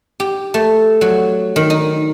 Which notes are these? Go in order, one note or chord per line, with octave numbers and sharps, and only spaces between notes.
G4
A3
F#3
D#3
D#4